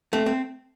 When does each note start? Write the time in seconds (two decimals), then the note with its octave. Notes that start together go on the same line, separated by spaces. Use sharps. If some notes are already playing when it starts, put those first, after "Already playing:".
0.13 A3 C4
0.26 C4